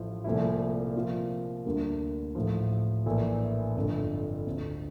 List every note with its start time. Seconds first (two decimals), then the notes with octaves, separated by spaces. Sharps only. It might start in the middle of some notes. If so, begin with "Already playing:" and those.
Already playing: A1 A2 F3
0.24 C2 A#2 F3 A3 E4
0.95 C3 F3 A#3 F4
1.66 D2 D3 G3 A#3
2.35 A1 A2 F3
3.06 A#1 A2 E3 A#3 E4
3.76 G1 F2 D3
4.46 D2 D3 A3 C4